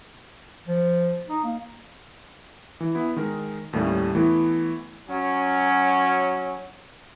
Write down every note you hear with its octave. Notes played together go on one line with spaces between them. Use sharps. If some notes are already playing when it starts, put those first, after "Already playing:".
F3
D#4
A#3
E3
B3 E4
D#3 G#3 A#4
D#2 A2 G3 A3 C#4
E3 A3 B3 E4
F#3 C#4